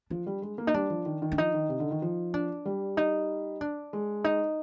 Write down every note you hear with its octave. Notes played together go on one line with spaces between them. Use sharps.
F3 D4
G3
G#3
A#3
D#4
G3 D4
F3
D#3
D#3
D4
F3 D#4
D#3
C3
D3
D#3
F3
D4
G3
D#4
D4
G#3
D#4